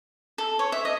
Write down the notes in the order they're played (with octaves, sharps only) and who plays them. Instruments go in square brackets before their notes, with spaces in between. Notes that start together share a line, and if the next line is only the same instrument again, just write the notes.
[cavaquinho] A4
C#5
E5
D#5